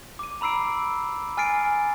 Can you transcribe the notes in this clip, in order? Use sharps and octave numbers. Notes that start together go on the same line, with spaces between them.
D6 D#7
A#5 B5 E6 C7 D7
G#5 F6 A6 C7 D7